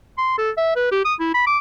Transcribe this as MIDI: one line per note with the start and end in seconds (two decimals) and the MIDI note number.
0.18 0.34 84
0.38 0.51 69
0.58 0.74 76
0.76 0.90 71
0.92 1.01 67
1.05 1.14 87
1.20 1.34 64
1.35 1.46 83
1.47 1.59 86